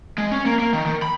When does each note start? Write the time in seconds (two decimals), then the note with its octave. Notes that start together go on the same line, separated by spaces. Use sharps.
0.18 G#3
0.31 C#4
0.45 A#3
0.59 A#3
0.73 D#3
0.86 D#3
1.02 B5